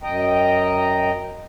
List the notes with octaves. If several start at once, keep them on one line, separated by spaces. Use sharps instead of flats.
F#2 D#5 G5 A#5